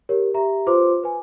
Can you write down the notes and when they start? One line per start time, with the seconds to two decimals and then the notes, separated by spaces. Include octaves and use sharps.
0.09 G4 A#4 C#5
0.34 G4 E5 A#5
0.67 F4 B4 C5 C6 D6
1.03 B4 G#5